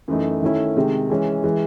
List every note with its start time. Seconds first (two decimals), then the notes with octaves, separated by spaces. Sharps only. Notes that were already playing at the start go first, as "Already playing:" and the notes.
0.08 F#2 E3 A3 D#4
0.42 D#3 A3 C#4 E4
0.77 C3 D#3 G#3
1.10 E3 G#3 C#4
1.44 E3 G#3